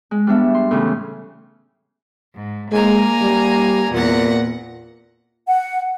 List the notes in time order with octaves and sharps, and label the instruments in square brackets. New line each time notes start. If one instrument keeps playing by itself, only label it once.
[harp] G#3
G3 B3 D4 E5
C6
A2 C#3 E3
[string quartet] G#2
[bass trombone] G#3 [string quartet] A#3 G#5 A#5
[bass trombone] G3
[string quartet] E2 F#5 A#6 [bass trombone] A#2
[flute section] F#5